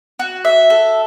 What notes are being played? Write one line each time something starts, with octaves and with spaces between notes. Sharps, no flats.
F#4
E5
A4